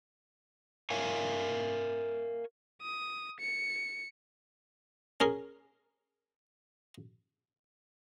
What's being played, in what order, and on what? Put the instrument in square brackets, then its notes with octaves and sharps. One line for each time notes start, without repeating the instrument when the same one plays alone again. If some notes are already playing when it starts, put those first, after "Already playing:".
[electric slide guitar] A#4 C#5 E5 F5 G#5
[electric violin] D#6
C#7
[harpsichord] C#4 G#4 A#4